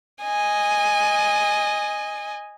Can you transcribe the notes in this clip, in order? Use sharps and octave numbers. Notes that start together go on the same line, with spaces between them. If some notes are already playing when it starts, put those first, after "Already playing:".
D#5 G#5